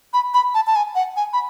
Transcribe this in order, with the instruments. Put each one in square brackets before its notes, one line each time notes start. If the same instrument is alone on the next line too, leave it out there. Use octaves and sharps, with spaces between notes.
[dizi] B5
B5
A5
A5
G#5
F#5
G#5
B5